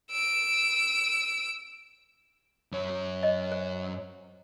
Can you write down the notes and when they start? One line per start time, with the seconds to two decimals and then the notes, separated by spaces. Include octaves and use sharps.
0.11 E6 D7
2.72 F#2 C#5
3.23 D#5
3.52 C5